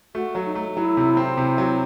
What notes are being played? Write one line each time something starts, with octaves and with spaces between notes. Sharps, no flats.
A3 F#4
F#3
D#4
A3
F#3 E4
C3
C4
C3 E4
F#3